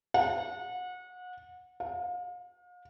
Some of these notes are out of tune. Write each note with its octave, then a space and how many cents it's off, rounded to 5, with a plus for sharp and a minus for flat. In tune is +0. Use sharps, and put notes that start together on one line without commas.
F#5 -30
F5 +40